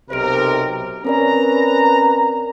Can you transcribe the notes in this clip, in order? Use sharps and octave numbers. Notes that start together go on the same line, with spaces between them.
B1 C3 A#4 C5 D7
C4 C#4 A#4 B4 D5 A#5